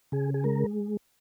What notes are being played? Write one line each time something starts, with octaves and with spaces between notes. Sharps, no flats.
C#3 G#4
G#4
G#3 A#4